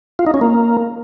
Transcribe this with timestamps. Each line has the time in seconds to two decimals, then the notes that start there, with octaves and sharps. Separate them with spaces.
0.19 F4
0.26 D#4
0.34 C#4
0.41 A#3